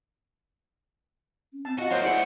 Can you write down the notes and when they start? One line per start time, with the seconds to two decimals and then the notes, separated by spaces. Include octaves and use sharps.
1.53 C#4
1.65 C4 A5
1.79 F4 F#4 D#5
1.91 F#3 A#3 C5 C#5 D#5 F#5 C6
2.03 A3 E4 G#4 C5 D5 F#5